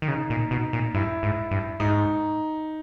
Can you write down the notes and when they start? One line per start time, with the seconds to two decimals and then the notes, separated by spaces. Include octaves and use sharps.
0.02 D#3
0.08 C#3 D#4
0.30 A#2
0.51 B2 D#4
0.73 A#2
0.94 G2 E4
1.23 G#2
1.51 G2
1.80 G#2 D#4